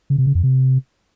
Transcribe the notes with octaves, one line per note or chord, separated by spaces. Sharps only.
C#3
C3
C#3
F2
C3